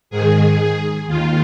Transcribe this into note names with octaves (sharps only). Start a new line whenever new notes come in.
G#2 D#3 G#4
D#2 D#3 F4